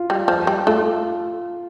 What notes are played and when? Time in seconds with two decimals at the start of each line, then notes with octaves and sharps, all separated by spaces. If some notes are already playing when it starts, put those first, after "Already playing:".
Already playing: F4
0.10 G3
0.28 F3
0.47 G3
0.67 A3 F4